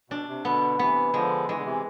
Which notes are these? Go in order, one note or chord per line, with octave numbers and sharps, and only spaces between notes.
B2 D4
C3
B2 D3 B3
C3 E3 B3
D3 F3 G#3
E3 G#3
D3
C3 E3